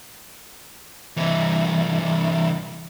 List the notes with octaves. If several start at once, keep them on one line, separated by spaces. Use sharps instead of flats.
C2 E3